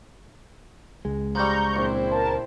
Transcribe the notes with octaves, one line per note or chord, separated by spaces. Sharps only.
C#2 G#3
F3 G3 A#5 C#6 G6
A#1 C4 E4 C5
A#4 A5